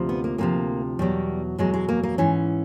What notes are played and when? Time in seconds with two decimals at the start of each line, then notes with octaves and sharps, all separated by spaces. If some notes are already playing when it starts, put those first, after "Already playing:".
Already playing: D2 C3 F3
0.09 B3
0.24 A#3
0.38 D2 C3 F3 A#3
0.99 E2 B2 F#3 G3
1.58 E2 B2 F#3 G#3
1.74 G#3
1.89 A#3
2.03 A#3
2.18 G#2 E3 C#4